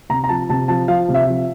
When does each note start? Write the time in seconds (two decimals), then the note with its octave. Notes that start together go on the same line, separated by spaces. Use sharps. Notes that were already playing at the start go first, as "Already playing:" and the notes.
0.09 C3 A#5
0.24 A#5
0.29 F3 A5
0.49 C3 A5
0.68 F3 A5
0.88 F3 F5
1.09 C3
1.14 E5
1.29 F3